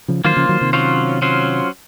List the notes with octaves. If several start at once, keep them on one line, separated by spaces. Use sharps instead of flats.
C#3 F3
D#3 F#3 A#3 F4 C5
C#3 F3
D#3 F#3
C3 D#3
F#3 C#4 F4 C5
F#3 C#4 F4 C5